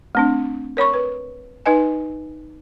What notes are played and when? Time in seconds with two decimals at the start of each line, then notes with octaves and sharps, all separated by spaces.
0.15 A3 C4 D4
0.77 A#4 C#5 B5 C#6
0.94 B4
1.66 D#4 B4 D#5 G#5